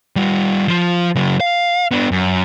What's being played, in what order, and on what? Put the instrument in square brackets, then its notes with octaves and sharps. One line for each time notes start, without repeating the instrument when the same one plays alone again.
[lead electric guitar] G3 F4
F3 F4
C#3 F#3
F5
B3 D4
F#2